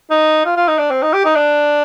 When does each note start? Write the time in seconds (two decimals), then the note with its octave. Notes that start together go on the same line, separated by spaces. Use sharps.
0.11 D#4
0.45 F4
0.56 F4
0.68 D#4
0.79 D4
0.90 C4
1.02 D#4
1.13 G4
1.25 D#4
1.36 D4